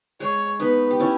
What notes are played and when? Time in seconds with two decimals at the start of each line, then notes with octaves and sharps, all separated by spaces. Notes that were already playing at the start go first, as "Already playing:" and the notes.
0.20 G#3 C#5
0.60 B3 D#4 B4
0.91 G4
1.00 C#4 E4